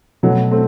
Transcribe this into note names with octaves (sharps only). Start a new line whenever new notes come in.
B2 F#3 A3
A3 C4